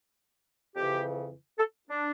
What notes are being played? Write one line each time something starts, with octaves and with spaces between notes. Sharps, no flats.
F2 C#3 E3 G4
A4
D4